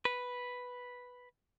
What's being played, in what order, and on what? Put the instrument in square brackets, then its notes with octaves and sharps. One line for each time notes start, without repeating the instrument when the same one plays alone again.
[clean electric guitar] B4